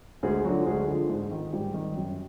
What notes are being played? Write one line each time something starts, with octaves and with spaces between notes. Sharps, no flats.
D2 G#3 G#4
D3 F3 F#3 F#4
D2 G#3 G#4
D3 F3
G#2
D#3
G#2 G3 G4
D#3
F#2